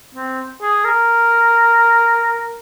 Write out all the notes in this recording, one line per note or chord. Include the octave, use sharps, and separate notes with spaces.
C4
G#4
A#4